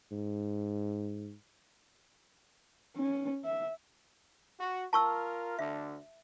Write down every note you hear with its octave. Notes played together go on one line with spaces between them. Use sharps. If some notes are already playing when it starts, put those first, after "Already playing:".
G#2
C#4
E5
F#4
F4 A#4 A5 C#6 E6
D2 D3 E5